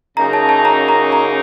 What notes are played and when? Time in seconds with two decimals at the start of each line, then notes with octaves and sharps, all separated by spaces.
0.17 F#2 C#3 F#3 A#3 D#4 A#5
0.33 A5
0.49 A5
0.65 A#5
0.89 A#5
1.12 A#5